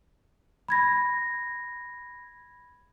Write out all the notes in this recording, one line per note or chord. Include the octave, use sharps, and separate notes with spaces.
B5 G#6 A#6